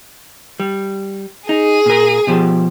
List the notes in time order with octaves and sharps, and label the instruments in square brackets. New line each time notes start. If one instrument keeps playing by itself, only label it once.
[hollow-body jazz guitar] G3
[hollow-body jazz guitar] D#4 [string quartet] G#4
[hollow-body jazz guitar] A#2 A#4
B2 F3 G4